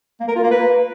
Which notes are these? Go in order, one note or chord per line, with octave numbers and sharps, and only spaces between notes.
A#3
A#4
F4
A#3
B4